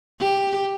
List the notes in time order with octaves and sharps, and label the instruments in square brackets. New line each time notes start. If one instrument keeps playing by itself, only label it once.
[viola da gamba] G4